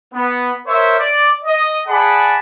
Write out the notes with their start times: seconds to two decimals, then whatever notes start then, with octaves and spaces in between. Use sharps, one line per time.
0.13 B3
0.67 A#4 C5 C#5 E5
0.97 D5
1.44 D#5
1.86 G#4 D5 F#5 A5 B5